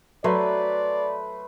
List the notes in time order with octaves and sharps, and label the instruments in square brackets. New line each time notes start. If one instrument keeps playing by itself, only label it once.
[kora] F#3 [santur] A3 B4 C6 [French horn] D5